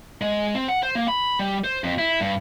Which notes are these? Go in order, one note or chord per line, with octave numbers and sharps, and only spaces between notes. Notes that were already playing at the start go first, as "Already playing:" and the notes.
G#3
C4
F#5
C5
A#3
B5
G3
C5
F2
E4
G2